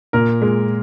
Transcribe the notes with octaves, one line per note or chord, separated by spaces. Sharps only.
A#2 A#4
G#3